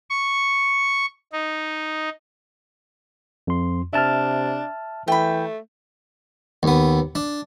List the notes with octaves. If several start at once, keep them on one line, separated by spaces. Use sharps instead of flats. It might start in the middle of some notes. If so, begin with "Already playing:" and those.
C#6
D#4
F2 C6
C3 D4 E5 A5 F6
E3 A3 G5 B5
D#2 B3
D4